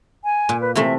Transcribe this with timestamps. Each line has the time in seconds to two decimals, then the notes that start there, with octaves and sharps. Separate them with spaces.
0.24 G#5
0.49 A#2
0.61 B4
0.75 C3 E3 A3 E5